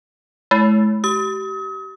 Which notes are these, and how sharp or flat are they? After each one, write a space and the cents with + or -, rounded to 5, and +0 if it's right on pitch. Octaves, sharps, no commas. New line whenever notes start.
G#3 +45 E4 +0
G4 -30 D#6 +40